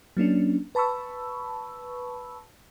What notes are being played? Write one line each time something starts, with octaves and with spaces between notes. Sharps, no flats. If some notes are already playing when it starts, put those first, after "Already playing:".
F#3 A#3 C#4 D4
B4 A5 B5 C#6 E6